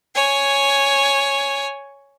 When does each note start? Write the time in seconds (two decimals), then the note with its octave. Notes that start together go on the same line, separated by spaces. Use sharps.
0.15 C#5 G#5